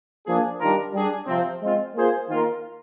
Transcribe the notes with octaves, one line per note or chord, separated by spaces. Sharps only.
F3 A#3 D4 G#4
D#3 G3 D4 F4 A#4
G3 D4 G#4
C3 F3 C4
G#3 C4 F4
A#3 F4 G#4 C5
D#3 A#3 F4 A#4